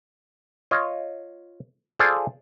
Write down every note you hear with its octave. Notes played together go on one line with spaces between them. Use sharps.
F4 C#5 D#5
F4 G#4 A4 C5 D5 F5